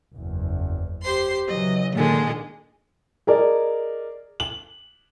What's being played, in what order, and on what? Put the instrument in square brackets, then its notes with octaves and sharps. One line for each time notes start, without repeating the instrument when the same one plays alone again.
[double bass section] F#1 E2
[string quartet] G4 C5 C6
[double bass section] C#3 E3 F#3 [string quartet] D#5
[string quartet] A#2 D3 G#3 [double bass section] D#3
[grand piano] G#4 A#4 D5 D#5
F#7